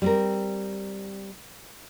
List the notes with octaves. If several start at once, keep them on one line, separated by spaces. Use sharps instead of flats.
G3 C4 A#4